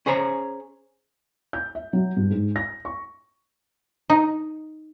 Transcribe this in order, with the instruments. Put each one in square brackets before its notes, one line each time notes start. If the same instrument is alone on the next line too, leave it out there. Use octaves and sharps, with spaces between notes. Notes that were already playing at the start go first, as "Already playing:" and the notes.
[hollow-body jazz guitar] C#4 G#4 C5 C#5 A#5
[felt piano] G6
E5
F#3
G2
G#2
A#6
C#6
[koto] D#4